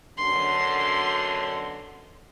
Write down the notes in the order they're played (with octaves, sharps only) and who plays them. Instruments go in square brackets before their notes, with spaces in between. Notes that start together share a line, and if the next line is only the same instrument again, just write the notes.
[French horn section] F#2 B2 D3 [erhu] C6